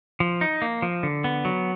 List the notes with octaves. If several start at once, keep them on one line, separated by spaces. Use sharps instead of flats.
F3
D#4
A#3
F3
D3
B3
F#3